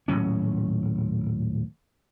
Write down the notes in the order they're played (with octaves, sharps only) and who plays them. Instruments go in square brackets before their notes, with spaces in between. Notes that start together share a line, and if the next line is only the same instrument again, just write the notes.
[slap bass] D#1 A2 F#3 C#4